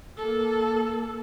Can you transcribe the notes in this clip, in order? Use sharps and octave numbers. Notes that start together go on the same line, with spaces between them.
A#3 A4